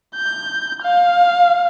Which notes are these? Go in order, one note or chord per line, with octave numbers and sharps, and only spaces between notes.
G6
F5